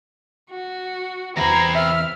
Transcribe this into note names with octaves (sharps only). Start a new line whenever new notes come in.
F#4
E2 C3 E3 C5 A#5 B5 G#6
E5 F6